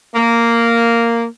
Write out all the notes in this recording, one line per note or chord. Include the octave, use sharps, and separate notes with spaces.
A#3